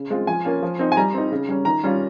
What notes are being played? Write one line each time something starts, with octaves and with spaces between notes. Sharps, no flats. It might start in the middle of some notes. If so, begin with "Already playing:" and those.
Already playing: C#3
G#3 C4 F4
F3 G#5
A#3 C#4 F4
F3
C4 D#4
G#5
G3 A#5
C4 D#4
C#3
G3 C#4
D#3 A#5
G3 C#4 F4